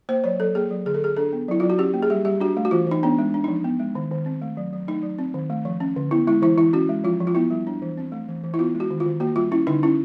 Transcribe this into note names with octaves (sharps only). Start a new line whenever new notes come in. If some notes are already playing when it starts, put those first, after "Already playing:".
A#3 C5
F#3 C#5
F#3 A4
A#3 G#4
F#3
D3 G#4
A4
D3 G#4
D4 A4
B3
F#3 E4
F#3 F4
F#4
C#4 G4
A#3
G#4
G3 G4
G3 G4
D4 F#4
A3
F#4
E3 F4
E3 D#4
B3 D4
G#3
D4
F3 D#4
B3
G#3
D#3
D#3
C4
A3
F#3
F#3
A3 D#4
F#3
C4
D#3
A3
F3
C#4
D3
B3 E4
G#3 E4
E3 E4
E3 E4
C#4 F#4
G#3
F3 F4
F3
F4
B3 E4
G3
D4
E3
C4
A3
E3
E3
E4
B3 F4
G#3
F#4
D#3
F4
D#3
A#3 F#4
G3 F4
C#4 E4
D3 D#4
C#4 E4